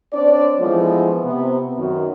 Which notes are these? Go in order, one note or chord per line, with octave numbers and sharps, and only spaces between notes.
C4 D4 C#5 D5
E3 F3 G#3 A3 B3 E4
C3 B3
F#2 D#3 F#4